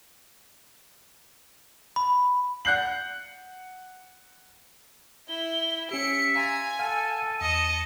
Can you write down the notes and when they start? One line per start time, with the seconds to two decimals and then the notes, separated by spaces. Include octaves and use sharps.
1.96 B5
2.65 F#5 F#6 G6 C7 F#7
5.29 E4 G7
5.91 C#4 G4 E5 C#7 D7
6.35 F5 G#5 A#5 C6 A6
6.79 A4 F5 F#5 F6 D#7
7.41 E2 D#5 A5 C#7